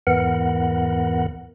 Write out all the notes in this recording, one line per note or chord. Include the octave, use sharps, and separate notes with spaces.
E2 G#2 E3 B3 A#4 F#5